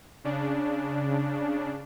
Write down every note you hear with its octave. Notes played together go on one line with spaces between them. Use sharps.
C#3 D4